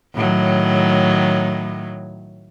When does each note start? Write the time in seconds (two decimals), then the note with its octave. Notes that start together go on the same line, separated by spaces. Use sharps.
0.15 A2 D#3 F#3